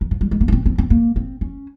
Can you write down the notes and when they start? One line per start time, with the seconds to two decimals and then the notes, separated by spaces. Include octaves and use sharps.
0.01 D#3
0.11 F3
0.21 G3
0.31 G#3
0.41 A#3
0.48 C#4
0.52 C4
0.66 C4
0.78 C4
0.90 A#3
1.16 C4
1.41 C#4